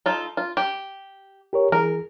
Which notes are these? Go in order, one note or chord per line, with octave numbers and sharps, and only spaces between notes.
D#4 F4 A4
F4
G4
G4 A#4 C#5
E3 G#4 A#4